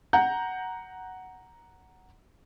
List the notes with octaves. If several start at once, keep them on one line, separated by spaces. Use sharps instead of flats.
F#5 A#5 G6